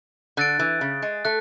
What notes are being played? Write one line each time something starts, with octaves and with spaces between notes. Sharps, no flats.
D3 F#6 A6 D7
E3
C#3
G#3
A3 F#6